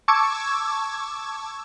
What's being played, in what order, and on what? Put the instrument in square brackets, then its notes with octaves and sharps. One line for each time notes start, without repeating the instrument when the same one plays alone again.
[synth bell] A5 C#6 D6 E6 G#6